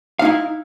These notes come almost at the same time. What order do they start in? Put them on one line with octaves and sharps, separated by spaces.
F5 D#4 E4